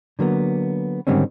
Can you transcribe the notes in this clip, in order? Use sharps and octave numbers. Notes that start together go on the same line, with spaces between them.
D3 F#3 A#3 B3
G#2 D3 D#3 G3 C4 C#4